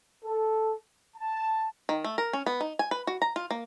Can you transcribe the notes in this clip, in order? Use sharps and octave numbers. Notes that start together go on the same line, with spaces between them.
A4
A5
D#3
A3
A#4
C#4
B3
D#4
G#5
B4
F#4
A#5
F4
A#3